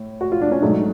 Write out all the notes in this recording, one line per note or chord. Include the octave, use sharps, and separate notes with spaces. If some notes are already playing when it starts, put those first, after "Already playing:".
Already playing: A2
F#4
F4
D4
C#4
G#2 F#3 A3 D4